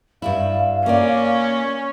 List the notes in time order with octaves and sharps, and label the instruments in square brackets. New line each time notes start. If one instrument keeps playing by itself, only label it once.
[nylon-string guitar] G2 G3 E4 [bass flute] F5
[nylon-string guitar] A#3 F4 D5 [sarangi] C#4